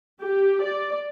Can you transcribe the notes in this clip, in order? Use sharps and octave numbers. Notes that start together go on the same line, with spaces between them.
G4
D5